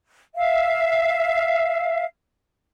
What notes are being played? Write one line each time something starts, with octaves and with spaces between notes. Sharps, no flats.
E5 F5